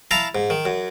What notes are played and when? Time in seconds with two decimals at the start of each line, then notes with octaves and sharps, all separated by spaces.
0.11 E4 F5 A5 A#5
0.35 G#2
0.50 D#3
0.66 F#2